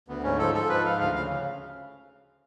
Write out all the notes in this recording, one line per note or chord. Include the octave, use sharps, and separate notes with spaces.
D2 B3
G#2 C#4
F3 A4
F3 A4
G#2 B4
F3 F5
D2 F5
C#3 F5